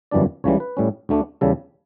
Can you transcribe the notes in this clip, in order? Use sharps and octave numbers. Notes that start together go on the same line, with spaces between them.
G1 F#2 E3 G3 D4 D5
C#2 C#3 E3 G3 C#5
B4
A2 G3 C#4
D2 D3 A3 D4
E2 C#3 G3 A4